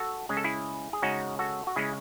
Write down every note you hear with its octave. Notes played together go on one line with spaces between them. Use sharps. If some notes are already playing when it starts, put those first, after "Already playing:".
Already playing: F#4 A4
C#3 G#3 C#4 G#4
A4
E4 G#4
G#4
C#3 G#3 C#4 D#4 F#4
F#4 A4
F#4
C#3 G#3 C#4 E4 G#4